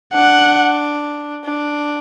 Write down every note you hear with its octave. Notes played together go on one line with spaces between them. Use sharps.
D4 F#5
D4